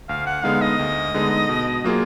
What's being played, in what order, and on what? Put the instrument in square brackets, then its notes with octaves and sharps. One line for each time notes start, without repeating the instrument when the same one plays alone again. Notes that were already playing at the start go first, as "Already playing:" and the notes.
[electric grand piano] D2 [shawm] F5
[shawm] F#5
[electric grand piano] D3 G#3 B3 D#4 [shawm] F5
[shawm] D#5
[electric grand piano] D2
D3 G#3 B3 D#4
B2
F#3 A#3 F4 G#4